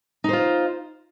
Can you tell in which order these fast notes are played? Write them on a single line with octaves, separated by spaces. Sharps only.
D#4 C5 F4